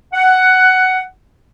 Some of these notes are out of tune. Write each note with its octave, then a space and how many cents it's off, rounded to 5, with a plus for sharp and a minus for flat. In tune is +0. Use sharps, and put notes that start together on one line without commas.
F#5 +10